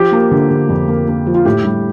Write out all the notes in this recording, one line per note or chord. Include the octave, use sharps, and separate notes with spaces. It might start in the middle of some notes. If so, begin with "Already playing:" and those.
Already playing: F3 G4
A#3
D3
D3
F2
A#3
A#3
F3
F4
A2 G4
G3